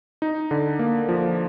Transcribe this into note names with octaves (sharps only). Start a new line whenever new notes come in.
D#4
D3
A#3
F3